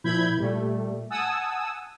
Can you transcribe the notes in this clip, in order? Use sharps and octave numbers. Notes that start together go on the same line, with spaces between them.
A#2 F3 E4 B5 G6 G#6
A#2 G3 A3
F#5 G#5 A5 D#6 E6